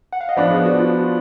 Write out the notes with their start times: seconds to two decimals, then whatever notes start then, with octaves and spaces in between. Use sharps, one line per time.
0.13 F#5
0.21 F5
0.29 D#5
0.37 F3 B3 D4 D5
0.51 G#4
0.66 F#4
0.80 F4
0.94 F4